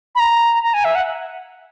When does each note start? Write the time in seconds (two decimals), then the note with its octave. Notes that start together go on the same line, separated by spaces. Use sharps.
0.15 B5
0.20 A#5
0.63 A#5
0.74 G#5
0.85 E5
0.95 F#5